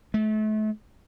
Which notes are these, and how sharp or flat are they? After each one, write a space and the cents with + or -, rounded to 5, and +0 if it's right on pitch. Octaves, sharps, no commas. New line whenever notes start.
A3 -35